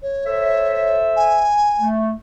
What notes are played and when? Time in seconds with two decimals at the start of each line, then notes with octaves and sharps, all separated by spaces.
0.02 C#5
0.25 A4 C5 E5
1.16 G#5
1.79 A3